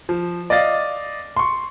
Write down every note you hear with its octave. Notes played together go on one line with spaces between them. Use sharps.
F3
D5 D#5 F5 A6
C6 C#6